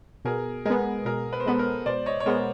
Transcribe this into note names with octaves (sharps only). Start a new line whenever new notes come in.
B2 G#4 A#4
G#3 B3 G#4 A#4
B2 G#4 A#4
B4
C5
G#3 B3 A4 B4
A#4 C5
B2 C5 D5
C#5 D#5
C#5
G#3 B3 A#4 C5